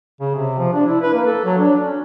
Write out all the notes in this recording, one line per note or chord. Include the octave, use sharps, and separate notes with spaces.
C#3
C3
F3
D4
E4
B4
A#3
A4
F#3
D4
C#4